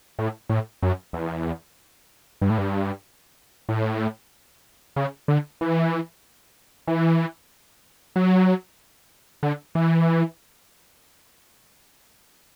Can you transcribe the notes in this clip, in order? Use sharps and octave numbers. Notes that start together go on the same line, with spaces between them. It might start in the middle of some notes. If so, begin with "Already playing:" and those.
A2
A2
F#2
E2
G2
A2
G2
A2
C#3
D3
E3
E3
F#3
D3
E3